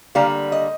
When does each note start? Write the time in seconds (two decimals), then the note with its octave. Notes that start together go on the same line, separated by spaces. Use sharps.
0.15 D3 G3 A#3 F5
0.52 D#5